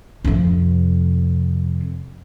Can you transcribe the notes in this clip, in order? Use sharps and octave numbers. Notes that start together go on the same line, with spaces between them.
F2 C3